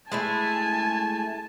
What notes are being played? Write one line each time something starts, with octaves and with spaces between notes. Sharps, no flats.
G#3 A3 E4 G#5 A5